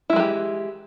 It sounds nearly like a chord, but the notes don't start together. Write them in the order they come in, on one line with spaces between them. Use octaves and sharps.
E4 G#3 F#3 G4 E3